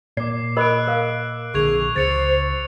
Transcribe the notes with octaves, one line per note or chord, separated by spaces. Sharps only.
A#2 D5 D6 C7
A#4 D#5 B5 E6 F#6 D7
A#4 F5
A#1 D3 G#4 C#6 G#6 F7
C#2 C5 A6 C#7 F7